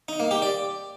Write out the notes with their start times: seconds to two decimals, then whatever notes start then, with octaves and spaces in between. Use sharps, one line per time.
0.09 D#4
0.20 A#3
0.31 G4
0.42 D5